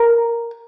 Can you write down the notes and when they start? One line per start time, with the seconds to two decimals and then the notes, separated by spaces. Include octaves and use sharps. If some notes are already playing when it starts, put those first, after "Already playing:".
Already playing: A#4